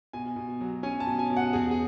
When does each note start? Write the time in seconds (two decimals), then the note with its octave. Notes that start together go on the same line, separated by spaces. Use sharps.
0.13 B2 G#5
0.36 B2
0.61 F#3
0.83 C#4 G#5
1.00 A5
1.07 B2
1.19 G#5
1.30 B2
1.37 F#5
1.53 E2 G#4
1.71 G#4